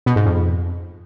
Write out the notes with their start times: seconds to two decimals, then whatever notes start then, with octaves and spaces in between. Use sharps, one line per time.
0.06 B2
0.16 G#2
0.26 F2